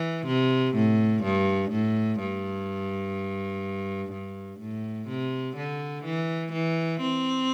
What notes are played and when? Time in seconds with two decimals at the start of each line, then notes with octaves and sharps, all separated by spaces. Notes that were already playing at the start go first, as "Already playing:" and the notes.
Already playing: E3
0.27 C3
0.75 A2
1.23 G2
1.71 A2
2.19 G2
4.13 G2
4.60 A2
5.08 C3
5.56 D3
6.05 E3
6.52 E3
7.01 C4